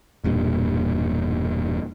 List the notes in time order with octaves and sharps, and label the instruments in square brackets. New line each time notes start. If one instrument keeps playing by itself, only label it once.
[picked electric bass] E1 E2 G2 A#2